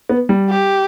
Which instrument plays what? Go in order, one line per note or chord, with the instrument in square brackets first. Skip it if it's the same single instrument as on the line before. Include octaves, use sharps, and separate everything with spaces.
[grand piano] B3
G3
[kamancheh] G4